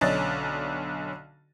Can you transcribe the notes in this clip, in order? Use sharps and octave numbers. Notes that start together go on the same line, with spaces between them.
B1 D3 C#4 D5 D#5 A6